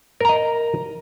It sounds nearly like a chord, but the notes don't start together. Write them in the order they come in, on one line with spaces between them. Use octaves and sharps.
A#4 A#5 D#5